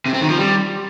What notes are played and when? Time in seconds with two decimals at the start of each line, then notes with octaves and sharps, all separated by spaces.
0.06 C3
0.13 C4
0.21 D#3
0.29 F3
0.37 G3